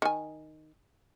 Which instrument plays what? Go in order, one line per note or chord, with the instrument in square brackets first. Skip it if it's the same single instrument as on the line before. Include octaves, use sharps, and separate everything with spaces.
[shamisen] D#3 G#5